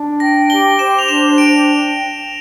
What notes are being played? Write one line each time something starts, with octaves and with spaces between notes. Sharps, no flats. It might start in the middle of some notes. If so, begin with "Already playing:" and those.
Already playing: D4
G5 A#6
G4 G7
C5 E7
F7
D4 E7
G5 D7